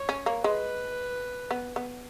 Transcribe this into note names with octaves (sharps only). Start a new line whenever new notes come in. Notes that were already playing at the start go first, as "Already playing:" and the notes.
Already playing: C#5
C#4
A#3
G#3 B4
B3
B3